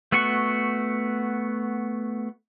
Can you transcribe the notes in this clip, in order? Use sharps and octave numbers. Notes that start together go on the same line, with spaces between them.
A3 B3 F#4 F#5 C#6